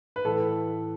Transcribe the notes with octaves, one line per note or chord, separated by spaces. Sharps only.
B4
A2 E3 A4